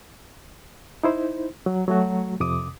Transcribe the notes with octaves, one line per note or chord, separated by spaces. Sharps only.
D#4 E4 C5
F#3
F#3 A3 F#4
F2 C3 D6 D#6